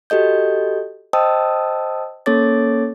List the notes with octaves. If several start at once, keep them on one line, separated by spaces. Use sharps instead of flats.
F#4 G4 A4 D#5 G6
C5 D#5 G5 A5 D#6 E6
A#3 C#4 A4 C#5 D6 A6